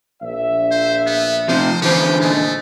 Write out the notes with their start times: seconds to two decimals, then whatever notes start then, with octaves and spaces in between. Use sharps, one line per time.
0.22 A#1 E5
0.71 C5
1.06 B3
1.48 C3 F3 C5
1.82 D3 E3 G4 C5
2.21 A#2 G#3 A3